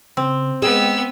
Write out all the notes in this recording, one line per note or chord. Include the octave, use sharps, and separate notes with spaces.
C#3 C4
G#3 B3 G5 E6